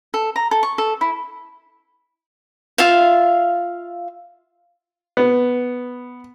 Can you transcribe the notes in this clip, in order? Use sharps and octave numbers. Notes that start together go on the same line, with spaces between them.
A4
A#5
A4
C#6
A4
E4
F4 E5 F5
B3